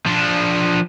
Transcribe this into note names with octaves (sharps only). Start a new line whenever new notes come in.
F3 D4